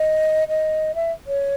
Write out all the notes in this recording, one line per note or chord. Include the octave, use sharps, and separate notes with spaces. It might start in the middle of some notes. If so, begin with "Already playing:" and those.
Already playing: D#5
D#5
E5
C#5